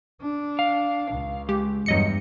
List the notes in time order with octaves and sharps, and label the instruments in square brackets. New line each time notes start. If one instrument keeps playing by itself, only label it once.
[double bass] D4
[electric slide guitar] F5
[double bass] C#2
[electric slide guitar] G#3 [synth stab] G4
[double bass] E2 G2 [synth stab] F#3 D#5 C#7